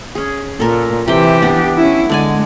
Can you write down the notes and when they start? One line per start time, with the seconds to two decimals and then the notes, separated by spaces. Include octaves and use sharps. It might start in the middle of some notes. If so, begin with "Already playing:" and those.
0.15 C#4 G#4
0.60 A#2 A4 A#4
1.08 C3 E3 G4 G5
1.42 B3 D4
1.77 C#4 E4
2.10 D3 G#3 D5 G#5